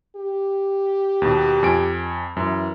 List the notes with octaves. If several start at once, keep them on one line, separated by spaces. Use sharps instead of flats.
G4
D#2 B2
F2 G#5 D7
F#2 E3